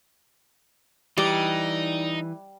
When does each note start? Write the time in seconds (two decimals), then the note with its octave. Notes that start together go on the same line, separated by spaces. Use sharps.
1.18 E3 G3 D#4 D5